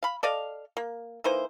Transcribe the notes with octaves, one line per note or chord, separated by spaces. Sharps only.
F5 B5
A4 D5 D#5 F5
A#3
E3 A#3 D#4 C5